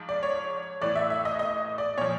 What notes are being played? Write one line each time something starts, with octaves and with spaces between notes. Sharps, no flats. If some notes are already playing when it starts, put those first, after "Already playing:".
Already playing: G#2 F3
D5
C#5
A2 E3 D5
E5
E5
D#5
D#5
D5
A#2 F3 C#5